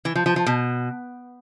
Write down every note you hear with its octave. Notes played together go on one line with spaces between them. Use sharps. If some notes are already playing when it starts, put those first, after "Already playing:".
E3
F3
F3
F3
B2